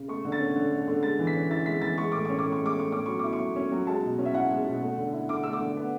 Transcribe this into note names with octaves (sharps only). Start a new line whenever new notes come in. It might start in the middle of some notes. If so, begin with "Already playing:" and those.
Already playing: C#3
A3 C#6
D3
A6
C#4
D3
A3
D3
G#3 A6
E3
B6
C#4
E4 A6
G#3 B6
E3 A6
G#3 C#6
A2 D6
C#4 C#6
D6
A2
C#6
G#3 D6
A2 C#6
C#4 D6
F#3 C#6
E4 D6
C#6
F#3
C#4
F#3
G#3 A5
B2
C#4
E5
E4 F#5
G#3
B2
A3
D3
E4
D3 D6
A3 E6
D6
D3
B3